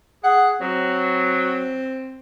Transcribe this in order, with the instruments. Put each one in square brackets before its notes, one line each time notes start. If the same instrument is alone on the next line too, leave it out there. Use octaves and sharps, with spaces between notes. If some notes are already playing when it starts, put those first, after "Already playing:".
[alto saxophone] G#4 [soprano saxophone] F#5
[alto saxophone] F#3 [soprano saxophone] C4